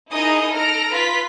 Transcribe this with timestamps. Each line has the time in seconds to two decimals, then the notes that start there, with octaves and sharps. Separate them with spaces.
0.12 D#4 E4 G#4 A#4 D#5 D#6
0.54 A4 A#5 F6 A#6 D7
0.93 F4 B4 B6